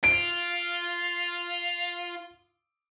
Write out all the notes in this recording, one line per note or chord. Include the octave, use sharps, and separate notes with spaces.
F4 D7